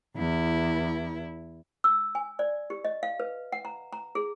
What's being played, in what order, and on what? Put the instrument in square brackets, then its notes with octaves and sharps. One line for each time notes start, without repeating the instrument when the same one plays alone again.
[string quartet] E2 E4
[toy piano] E6
G#5
D5
G4
D#5
F5
B4
F#5
A#5
A#5
G#4